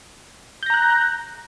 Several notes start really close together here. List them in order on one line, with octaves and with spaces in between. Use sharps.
G6 A#6 A#5 F#6